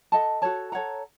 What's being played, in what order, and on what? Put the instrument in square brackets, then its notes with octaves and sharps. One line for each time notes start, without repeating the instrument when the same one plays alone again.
[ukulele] A4 D#5 F#5 A5
F#4 A4 C#5 A5
A4 C#5 F#5 A#5